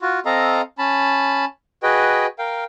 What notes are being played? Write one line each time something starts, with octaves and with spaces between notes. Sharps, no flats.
F4 F#4
C4 A4 D#5 F5 A#5
C#4 A5 B5
F#4 G#4 B4 D#5 G5
A#4 F5 G5